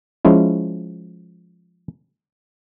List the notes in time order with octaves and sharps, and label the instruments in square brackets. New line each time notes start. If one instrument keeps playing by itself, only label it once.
[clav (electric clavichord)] F3 G#3 C#4 E4